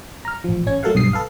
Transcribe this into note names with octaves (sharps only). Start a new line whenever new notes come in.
A#5 F6
A1 F3
A1 C#4 C#5 G#6
F#3 A3 A4 A#4 F5 F#5
B1 G2 D#6 C7
A4 B4 F5